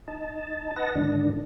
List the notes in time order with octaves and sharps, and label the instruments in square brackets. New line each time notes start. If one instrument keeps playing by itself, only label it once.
[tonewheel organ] D#4 A5
B4 D#5 F#5 A5 A#6
G#2 D3 D#3 D4